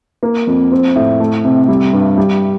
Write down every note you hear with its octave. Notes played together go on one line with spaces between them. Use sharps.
A#3
F2
C4
A2
A3
C3
G3
G2
G3